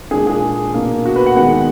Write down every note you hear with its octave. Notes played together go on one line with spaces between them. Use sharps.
A#2 G#3 D4 G#4
G#4
B2 A#3 D4
F#4
B4
F#5
D#2 D#3 G#3 B3 F#5